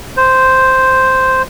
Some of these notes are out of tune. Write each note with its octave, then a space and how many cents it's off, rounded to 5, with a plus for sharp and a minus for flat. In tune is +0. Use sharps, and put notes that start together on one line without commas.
C5 -5